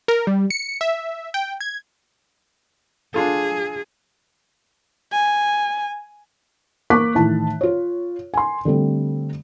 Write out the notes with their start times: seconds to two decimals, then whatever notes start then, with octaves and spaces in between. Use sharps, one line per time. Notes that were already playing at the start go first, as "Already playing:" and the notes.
0.08 A#4
0.27 G3
0.50 C#7
0.81 E5
1.34 G5
1.61 G#6
3.14 D4 F4 G#4 A4
5.12 G#5
6.90 A#3 C#6 D6 F#6 B6
7.15 A2 D#3 E3 A5
7.61 F4 C#5
8.34 G#5 C6
8.65 D3 G3 A3 C4